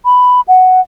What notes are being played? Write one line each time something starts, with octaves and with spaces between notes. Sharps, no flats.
B5
F#5